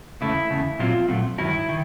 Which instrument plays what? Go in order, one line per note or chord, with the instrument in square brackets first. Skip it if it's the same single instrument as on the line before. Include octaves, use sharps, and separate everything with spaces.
[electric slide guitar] E2 C#3 A3 E4
E2 C#3 A3
A#2 F#3 A3 C4 F4
A#2 F#3 A3 C4
G2 D#3 F#3 E4
D#3